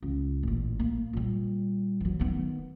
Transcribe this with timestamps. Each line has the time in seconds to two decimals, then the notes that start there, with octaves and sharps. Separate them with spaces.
0.02 C#2
0.43 A1 A#2
0.79 A#3
1.13 A#2 G3
2.00 E3 F#3
2.19 D#3 B3